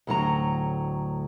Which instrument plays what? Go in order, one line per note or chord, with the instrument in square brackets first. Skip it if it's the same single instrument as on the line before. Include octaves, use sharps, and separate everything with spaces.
[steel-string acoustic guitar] D2 A2 F#3 A#5